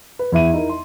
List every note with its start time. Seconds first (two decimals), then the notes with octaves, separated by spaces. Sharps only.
0.19 B4
0.32 E2 E4 E5 D#7
0.53 D#4 E4 A#4
0.69 C6